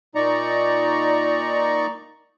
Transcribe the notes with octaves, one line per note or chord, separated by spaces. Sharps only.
A#2 D#4 D5 A#5 C#6